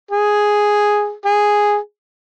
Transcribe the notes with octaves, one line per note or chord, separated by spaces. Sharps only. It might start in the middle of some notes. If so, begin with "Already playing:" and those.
G#4
G#4